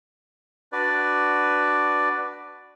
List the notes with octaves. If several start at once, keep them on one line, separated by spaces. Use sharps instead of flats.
D4 F#4 B4 D5